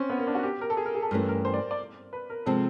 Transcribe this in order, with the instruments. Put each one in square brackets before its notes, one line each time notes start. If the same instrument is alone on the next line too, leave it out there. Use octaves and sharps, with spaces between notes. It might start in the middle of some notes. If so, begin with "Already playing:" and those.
Already playing: [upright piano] C4 C#4
B3
A#3
D4
F#4
G4
A#4
A4
G#4
A#4
G#4
A4
[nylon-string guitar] G2 E3 A3 C#4 [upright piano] A#4
[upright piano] A#4
C5
D5
D5
B4
A#4
[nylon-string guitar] C3 F3 G#3 C4 [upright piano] A4